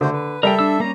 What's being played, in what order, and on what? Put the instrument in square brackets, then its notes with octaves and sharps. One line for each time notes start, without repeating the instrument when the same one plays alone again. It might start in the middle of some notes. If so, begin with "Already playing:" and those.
[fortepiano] D3 [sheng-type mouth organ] A3 F#4 C5
[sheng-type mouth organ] B4
[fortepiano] G3 [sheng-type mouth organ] A4 E5 [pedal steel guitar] A#4 G5
[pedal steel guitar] D4 E6
[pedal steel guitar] A#3 C#4 [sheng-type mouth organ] A#5